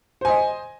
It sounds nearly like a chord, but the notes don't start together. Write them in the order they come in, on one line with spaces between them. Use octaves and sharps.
C5 G#5 D#5